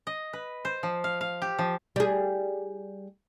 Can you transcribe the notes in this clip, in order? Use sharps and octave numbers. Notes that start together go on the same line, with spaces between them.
D#5
B4
C5
F3
F5
F5
G4
F3
G3 G#4